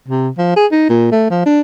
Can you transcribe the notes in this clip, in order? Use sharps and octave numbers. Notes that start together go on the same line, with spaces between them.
C3
F3
G#4
D#4
A#2
A3
F3
D4